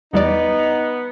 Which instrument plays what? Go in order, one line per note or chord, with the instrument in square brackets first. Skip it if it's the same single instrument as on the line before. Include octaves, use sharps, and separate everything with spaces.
[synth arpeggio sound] E2 G3 D5 [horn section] B3 [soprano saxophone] D#4